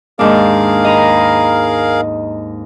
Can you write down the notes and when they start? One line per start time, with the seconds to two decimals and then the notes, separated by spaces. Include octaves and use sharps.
0.19 D#2 G#2 D4 G#4 A#4 F5
0.85 D#5 A#5 B5